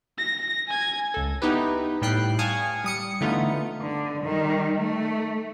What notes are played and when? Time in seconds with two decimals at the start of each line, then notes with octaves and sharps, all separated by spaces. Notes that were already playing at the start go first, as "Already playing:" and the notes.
0.19 A#6
0.68 G#5 G#6
1.14 C#2 A4
1.42 B3 D#4 E4 G4 B4
2.02 A2 G3 G5 F#6 C7
2.39 F5 G#5 A5 C#6 D#6
2.84 G3 D#6 C#7
3.21 D3 E3 A3 B3 D#4 F4
3.81 D3
4.24 D#3 G3
4.78 A3